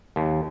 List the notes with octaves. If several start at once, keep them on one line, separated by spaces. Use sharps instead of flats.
D#2